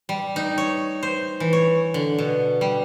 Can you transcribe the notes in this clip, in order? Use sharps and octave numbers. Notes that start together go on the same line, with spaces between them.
G3
D#4
C#5
C5
E3
C#5
D3
B2
G3